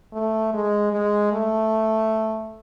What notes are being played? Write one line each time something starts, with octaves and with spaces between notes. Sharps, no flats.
A3
G#3
G#3
A3